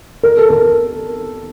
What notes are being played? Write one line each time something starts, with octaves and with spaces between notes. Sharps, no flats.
A#4
A4
A#4